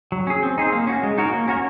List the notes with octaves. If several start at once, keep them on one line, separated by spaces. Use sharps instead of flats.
F#3
C#4 G#4
C4
D#4 G#4 C5
A#3
C#4 F#4
G#3
D#4 F#4 A#4 C#5
A#3
C#4 F#4 A#4 C#5